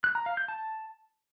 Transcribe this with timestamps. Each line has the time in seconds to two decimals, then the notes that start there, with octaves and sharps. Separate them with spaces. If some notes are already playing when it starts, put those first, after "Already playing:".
0.04 F#6
0.15 A#5
0.26 F5
0.37 G6
0.48 A5